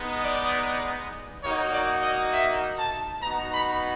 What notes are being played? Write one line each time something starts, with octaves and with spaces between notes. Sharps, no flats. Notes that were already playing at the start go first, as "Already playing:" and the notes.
Already playing: G#3 B3 D#4
D5
A#3 D#4 F#4 C#5
D5
D#5
E5
A5
B3 D#4 F#4 A#5
B5